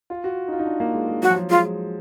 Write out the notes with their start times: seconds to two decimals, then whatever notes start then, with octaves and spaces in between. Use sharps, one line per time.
0.10 F4
0.24 F#4
0.48 D#4
0.52 F4
0.59 D#4
0.66 D4
0.80 A#3
0.94 G#3
1.08 G#3
1.22 F#3 F#4
1.30 F3
1.36 F#3
1.50 G#3 F4